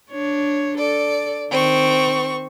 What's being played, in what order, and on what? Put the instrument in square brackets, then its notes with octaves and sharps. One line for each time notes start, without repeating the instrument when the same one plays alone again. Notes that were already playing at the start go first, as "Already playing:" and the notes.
[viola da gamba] D4 C#5
[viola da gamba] A4 [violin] D5
[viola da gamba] D#3 [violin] C4 C#6